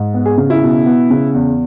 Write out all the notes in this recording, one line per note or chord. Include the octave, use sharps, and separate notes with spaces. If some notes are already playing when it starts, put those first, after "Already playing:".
Already playing: G#2
B3
G#4
C#3
E4
B2
B3
C#3
E2